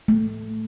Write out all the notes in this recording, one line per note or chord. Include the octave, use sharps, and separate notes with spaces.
A3